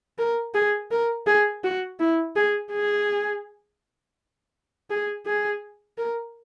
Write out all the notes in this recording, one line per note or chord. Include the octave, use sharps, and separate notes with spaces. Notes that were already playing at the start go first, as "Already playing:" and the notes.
A#4
G#4
A#4
G#4
F#4
E4
G#4
G#4
G#4
G#4
A#4